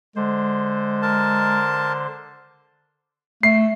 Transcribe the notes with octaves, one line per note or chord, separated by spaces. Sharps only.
D3 G#3 C5
A#4 A5
A3 C7